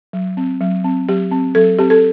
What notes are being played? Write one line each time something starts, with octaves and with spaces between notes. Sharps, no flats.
F#3
C4
F#3
C4
F#3 G4
C4
F#3 A4
C4 G4
A4